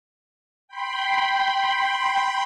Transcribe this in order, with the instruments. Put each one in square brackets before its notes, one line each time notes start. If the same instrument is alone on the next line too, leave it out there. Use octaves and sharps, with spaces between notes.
[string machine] G5 B5 C6